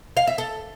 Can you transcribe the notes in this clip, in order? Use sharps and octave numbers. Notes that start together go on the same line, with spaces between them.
F5
E5
A4